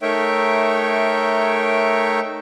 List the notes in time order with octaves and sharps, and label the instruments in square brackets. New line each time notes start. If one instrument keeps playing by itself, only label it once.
[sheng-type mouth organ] A3 D#4 A#4 C#5 E5 G5